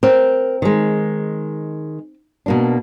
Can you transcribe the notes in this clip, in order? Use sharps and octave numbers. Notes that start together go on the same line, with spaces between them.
C4 A#4
D#3 G#3
B2 A#3 D4